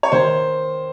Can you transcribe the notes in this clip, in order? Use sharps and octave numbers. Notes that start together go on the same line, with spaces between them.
C#5
D#3 C5